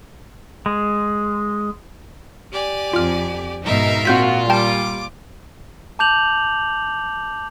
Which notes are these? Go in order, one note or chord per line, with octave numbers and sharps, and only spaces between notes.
G#3
G4 D5 G#5
F2 F4 F6
G#2 B2 D#4 A#4 E5 F5
A#2 C4 F4 F#4 G6 B6
G3 G5 A5 D6
A5 D6 G6 F7 F#7